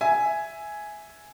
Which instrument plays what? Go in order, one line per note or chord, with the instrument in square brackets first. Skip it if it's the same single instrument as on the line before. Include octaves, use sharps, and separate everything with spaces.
[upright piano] E5 G#5